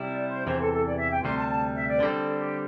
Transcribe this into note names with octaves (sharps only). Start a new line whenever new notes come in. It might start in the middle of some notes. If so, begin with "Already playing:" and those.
Already playing: C3 G3 E4
D5
C5
E2 C3 E3 C5
A4
A4
D5
E5
G5
D2 C3 G3 C6
A5
A5
E5
D5
C5
D3 G3 C4 A4
G4